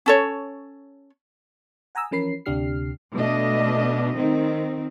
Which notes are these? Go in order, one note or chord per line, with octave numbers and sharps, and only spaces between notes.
C#4 A4 C#5
F#5 G#5 A#5 D#6 E6
E3 F3 C#4 A#4 B5 C7
D2 C3 D4 G4 F6 C7
B2 A3 D4 D#5
D#3 C4